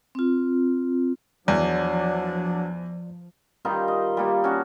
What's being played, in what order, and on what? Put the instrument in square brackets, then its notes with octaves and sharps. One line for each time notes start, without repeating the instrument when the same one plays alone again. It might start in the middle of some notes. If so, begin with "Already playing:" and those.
[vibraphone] C4 F4
[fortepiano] E2 [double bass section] F3 [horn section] F#3 D4 [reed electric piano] D5
[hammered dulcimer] D#3 G3 D#4 F4
D#5
G3 A#3 G4
C#4 D4 F#4